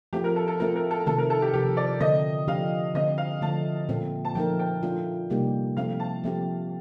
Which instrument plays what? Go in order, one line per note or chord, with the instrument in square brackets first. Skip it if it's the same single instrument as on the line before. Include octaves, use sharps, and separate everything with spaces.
[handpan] F3 A3 C4 F4 [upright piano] G4
[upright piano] A#4
A4
A4
[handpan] A3 C4 F4 A4 [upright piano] A#4
[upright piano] A#4
A4
[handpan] C3 D#3 A3 C4 [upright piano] A4
[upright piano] A#4
A4
G4
[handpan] C3 F3 A3 [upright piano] G4
[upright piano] D5
[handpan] D3 A3 C4 [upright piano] D#5
[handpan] F3 A3 D4 G4 [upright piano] F5
[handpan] D3 A3 C4 [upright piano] D#5
[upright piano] F5
[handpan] D3 F3 A3 [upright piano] A5
[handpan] A#2 A3 C4
[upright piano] A5
[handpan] F3 A3 D#4 A#4 [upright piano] G5
[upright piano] G5
[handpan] A3 D4 F4
C3 G3 A#3 D#4 G4
[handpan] F3 A3 C4 [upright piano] F5
[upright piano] A5
[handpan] F3 A3 C4 G4